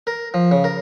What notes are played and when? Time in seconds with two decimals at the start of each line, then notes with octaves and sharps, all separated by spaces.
0.07 A#4
0.34 F3
0.51 C#3
0.64 A#4